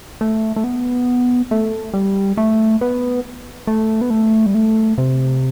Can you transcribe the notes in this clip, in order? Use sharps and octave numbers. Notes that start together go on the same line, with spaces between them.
A3
A3
B3
A3
G3
A3
B3
A3
B3
A3
G3
A3
C3